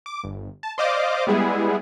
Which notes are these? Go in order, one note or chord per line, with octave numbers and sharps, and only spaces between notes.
D6
G1
A5
C5 D5 D#5 F5 D6
G3 G#3 B3 E4 G#4